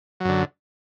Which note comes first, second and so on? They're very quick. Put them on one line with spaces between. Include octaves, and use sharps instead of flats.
F#3 F#2 D3